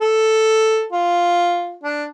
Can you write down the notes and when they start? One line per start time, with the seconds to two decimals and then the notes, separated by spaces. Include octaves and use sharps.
0.01 A4
0.92 F4
1.83 D4